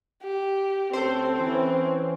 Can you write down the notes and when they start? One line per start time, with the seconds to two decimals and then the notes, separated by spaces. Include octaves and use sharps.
0.22 G4
0.93 D2 C4 C#4 A4 C5
1.39 E3 C#4